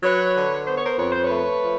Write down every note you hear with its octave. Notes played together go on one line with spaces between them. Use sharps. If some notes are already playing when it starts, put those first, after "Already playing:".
F#3 B4 C#5
D3
B3 C5
C#5
A#4 C5
F2 C#5
C5
B4 C#5
A3
F3